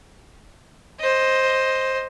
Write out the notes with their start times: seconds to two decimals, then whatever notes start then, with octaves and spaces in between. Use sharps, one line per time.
0.99 C5 D#5